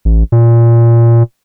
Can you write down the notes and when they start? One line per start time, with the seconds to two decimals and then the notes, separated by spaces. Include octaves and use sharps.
0.05 A1
0.32 A#2